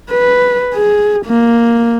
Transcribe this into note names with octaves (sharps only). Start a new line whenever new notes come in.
B4
G#4
A#3